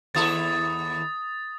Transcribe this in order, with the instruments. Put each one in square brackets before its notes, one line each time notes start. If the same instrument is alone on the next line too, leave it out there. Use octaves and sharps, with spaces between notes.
[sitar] D#2 E4 A4 [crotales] D#6 A6